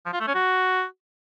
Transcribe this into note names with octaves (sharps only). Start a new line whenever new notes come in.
F3
F4
A3
C#4
F#4